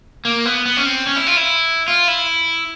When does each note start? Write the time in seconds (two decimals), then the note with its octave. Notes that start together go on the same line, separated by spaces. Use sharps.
0.25 A#3
0.45 B3
0.66 B3
0.77 C#4
0.86 C4
1.07 C#4
1.16 E4
1.27 F4
1.36 E4
1.88 F4
2.08 E4